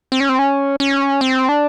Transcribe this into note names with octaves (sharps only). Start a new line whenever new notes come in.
C4
C#4
C4
C#4
C#4
C4
D4